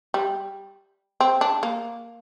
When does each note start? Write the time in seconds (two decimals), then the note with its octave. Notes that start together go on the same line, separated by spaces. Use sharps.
0.14 G3
1.21 C4
1.41 D4
1.63 A#3